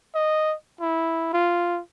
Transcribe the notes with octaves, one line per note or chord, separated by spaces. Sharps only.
D#5
E4
F4